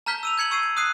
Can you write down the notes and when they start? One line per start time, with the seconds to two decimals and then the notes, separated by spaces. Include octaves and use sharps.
0.06 A5 A#5 F6 G6 B6 G7
0.23 E6 D#7 F7
0.38 G6 G#6 C#7 F#7
0.51 C#6 E6 G#6 C7 D#7
0.63 G#6
0.77 D#6 F#6 C7 D#7